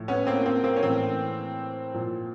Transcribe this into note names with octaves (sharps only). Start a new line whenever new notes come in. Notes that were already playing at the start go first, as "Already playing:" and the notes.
Already playing: A2 F3
B3 C#4
A#3 C4
A#3 C4
A#3 C4
C#4
A2 E3 A#3 C4
A#2 F3